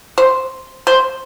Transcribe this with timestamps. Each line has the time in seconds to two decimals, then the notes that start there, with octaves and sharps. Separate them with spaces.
0.18 C5
0.87 C5